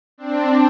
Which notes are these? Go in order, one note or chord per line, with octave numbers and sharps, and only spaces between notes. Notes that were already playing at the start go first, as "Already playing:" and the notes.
C4 D4